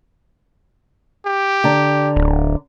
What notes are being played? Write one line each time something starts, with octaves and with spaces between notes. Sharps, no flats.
G4
D3 D5 A#5
D1